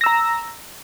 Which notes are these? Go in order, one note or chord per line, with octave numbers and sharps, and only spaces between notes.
A#5 E6 A#6